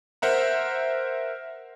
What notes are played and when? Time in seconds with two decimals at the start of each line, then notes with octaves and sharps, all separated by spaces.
0.22 A#4 C5 E5 F#5 A#5